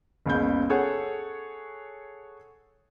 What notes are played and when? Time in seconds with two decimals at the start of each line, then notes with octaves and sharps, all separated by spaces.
0.26 F#1 C#2 B3 G6
0.70 G#4 A4 C#5 F#5